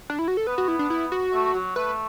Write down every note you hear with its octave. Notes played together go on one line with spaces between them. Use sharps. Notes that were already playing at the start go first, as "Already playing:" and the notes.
D4
E4
F#4
A4
B3 B4
F#4
E4
D4
E4
F#4
A3
F#3
A3 B4